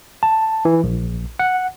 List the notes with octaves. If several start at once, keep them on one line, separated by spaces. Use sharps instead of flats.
A5
E3
A#1
F#5